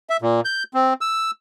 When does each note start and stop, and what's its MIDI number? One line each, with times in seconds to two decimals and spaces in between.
0.10 0.17 76
0.22 0.41 46
0.45 0.63 91
0.74 0.94 60
1.01 1.31 88